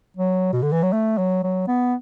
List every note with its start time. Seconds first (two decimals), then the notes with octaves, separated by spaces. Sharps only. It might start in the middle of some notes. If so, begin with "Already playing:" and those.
0.17 F#3
0.53 B2
0.63 D3
0.72 E3
0.83 F#3
0.93 A3
1.18 F#3
1.43 F#3
1.68 B3